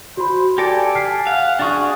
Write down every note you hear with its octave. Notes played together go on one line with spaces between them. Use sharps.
F#4 C5 B5
G4 A4 D5 G#5 A#6
F6 B6 C7
F5 F#5
D4 F#4 G#4 C#6 A6